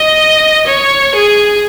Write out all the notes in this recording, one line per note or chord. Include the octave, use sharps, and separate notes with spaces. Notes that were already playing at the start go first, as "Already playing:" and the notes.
Already playing: D#5
C#5
G#4